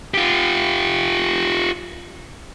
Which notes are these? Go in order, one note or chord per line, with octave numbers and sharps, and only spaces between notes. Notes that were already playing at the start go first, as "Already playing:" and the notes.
F4 G4